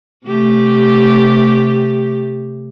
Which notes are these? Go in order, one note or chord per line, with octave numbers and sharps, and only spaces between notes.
C3 A3 G4